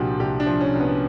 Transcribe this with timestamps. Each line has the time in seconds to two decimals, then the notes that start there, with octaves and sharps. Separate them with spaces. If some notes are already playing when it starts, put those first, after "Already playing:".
Already playing: C2 A#2 F3 D4 F#4 G4
0.19 C2 G4
0.40 D4
0.46 F3
0.60 C#4
0.73 C2
0.80 B3